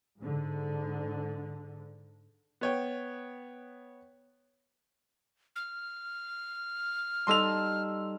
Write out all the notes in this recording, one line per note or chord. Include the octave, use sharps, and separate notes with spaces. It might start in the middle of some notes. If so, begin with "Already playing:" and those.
G#2 D3
B3 C#5 G5
F6
G3 D#4 A4 C6 E6 F7